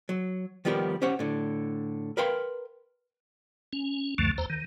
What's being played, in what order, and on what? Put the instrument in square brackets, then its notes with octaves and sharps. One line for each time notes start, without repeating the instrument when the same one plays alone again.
[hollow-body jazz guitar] F#3
D#3 F3 G3 B3 G4 A#4
C#4 G4 C5 C#5 F#5
A2 D3
A#4 B4 F5 G5 C6
[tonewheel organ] C#4
C#2 F#2 D3 F3 A3
E2 C5 A#5
D#3